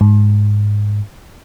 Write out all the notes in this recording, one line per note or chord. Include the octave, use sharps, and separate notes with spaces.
G#2